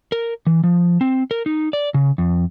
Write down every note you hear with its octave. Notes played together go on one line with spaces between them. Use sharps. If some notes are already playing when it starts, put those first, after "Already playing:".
A#4
E3
F3
C4
A#4
D#4
D5
C#3
F2